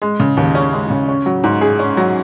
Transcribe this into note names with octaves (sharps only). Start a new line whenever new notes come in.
G#3
C#3
D#2
C#4
G#3
C#3
C#4
F#3
G#2
G#4
C#4
F#3